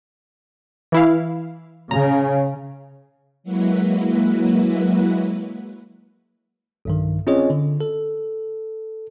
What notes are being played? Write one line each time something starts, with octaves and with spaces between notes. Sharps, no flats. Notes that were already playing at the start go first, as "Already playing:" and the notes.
E3 E4 F5
C#3 A#5
F#3 G#3 A#3 E4 F#4 B4
B1 G2 D#3
C4 C#4 F4 G#4 C#5 D#5
D3
A4